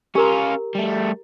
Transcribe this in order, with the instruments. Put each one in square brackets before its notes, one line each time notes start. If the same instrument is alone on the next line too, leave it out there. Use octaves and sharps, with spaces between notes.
[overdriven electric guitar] C#4 F4 [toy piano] G4 A#4 A#5
[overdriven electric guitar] G3 A3